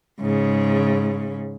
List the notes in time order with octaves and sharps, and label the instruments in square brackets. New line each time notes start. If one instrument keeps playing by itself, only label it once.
[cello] G#2 C#3